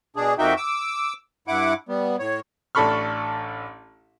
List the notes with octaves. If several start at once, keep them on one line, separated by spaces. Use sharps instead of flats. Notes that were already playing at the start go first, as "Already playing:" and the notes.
B2 D4 G#4
F2 A#3 D#4 F#4 E5 G5
D6 E6
G2 E4 F#5 D6
G3 B3
A2 C#5
A1 D4 A4 B5 C#6 F6